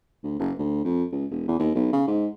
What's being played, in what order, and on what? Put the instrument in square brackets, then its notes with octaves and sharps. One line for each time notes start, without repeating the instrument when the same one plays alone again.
[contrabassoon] D2
F#1
D2
F2
C#2
E1
E2
D#2
B1
C#3
G#2